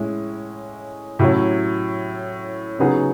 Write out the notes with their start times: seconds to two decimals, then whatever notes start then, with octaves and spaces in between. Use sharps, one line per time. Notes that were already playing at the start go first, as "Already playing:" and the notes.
Already playing: A2 G#3 C#4 E4
1.19 A2 F#3 C#4 E4
2.79 C#3 F#3 B3 D#4 G#4